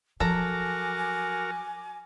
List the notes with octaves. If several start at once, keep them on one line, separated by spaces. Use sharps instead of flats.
F3 F#3 F#4 A4 A#4 G#5 A#5 D6